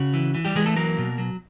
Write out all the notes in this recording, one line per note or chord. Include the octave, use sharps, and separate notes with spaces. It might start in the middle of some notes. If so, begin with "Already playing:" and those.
Already playing: C#3 F#4
E3
E3
G3 G4
E3 G#3 G#4
A3 A4
F#3 A#3 A#4
B2
F#3